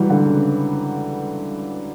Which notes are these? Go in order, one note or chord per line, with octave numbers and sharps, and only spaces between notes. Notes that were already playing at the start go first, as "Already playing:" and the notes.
Already playing: E3 F#3 G3
D3
C#3